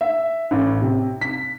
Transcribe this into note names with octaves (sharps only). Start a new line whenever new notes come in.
E5
A1
C3
B6